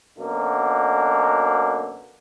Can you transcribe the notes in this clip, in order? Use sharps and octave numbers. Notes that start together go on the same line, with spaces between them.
F#2 B2 D3 A#3